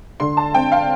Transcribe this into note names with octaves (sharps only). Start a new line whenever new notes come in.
D3 C6
A5
C4 G5
F5